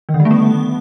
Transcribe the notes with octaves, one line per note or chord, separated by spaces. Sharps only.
D#3
D3
G3
A3
B3